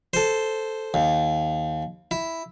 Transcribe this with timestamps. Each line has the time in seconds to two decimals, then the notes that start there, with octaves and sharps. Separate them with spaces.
0.13 A4 C5
0.94 D#2
2.11 E4